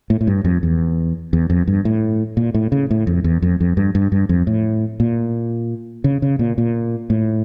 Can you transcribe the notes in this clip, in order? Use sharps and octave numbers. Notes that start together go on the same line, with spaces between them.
A2
A2
G2
F2
E2
E2
F2
G2
A2
A#2
A2
C#3
A2
F2
E2
F2
F2
G2
G2
G2
F2
A2
A#2
C#3
C#3
A#2
A#2
A2